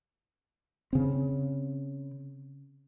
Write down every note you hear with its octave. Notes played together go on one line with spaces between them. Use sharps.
C#3 C4